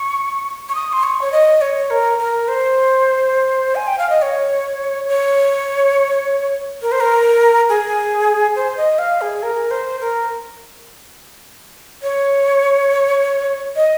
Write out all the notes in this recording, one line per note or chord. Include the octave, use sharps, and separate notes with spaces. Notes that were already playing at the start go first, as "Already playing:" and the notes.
Already playing: C#6
C#6
D#6
C6
C#6
C#5
D#5
C#5
A#4
A#4
C5
G#5
G5
F5
D#5
C#5
C#5
A#4
C5
A#4
G#4
C5
D#5
F5
G#4
A#4
C5
A#4
C#5
D#5